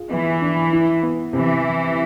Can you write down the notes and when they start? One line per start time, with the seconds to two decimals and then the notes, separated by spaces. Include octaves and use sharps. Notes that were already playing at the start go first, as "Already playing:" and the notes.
Already playing: F4 G#4
0.11 E3 B3
0.42 D4
0.73 E4
1.03 B3
1.33 C3 E3